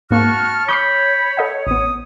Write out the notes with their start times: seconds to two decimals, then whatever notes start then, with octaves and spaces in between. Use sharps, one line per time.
0.11 G#2 A#3 C4 F#4 A5 C#6 F6
0.68 C#5 B5 C#6 D6 G6 C7
1.37 A4 D#5 F#5
1.67 A1 B3 D#6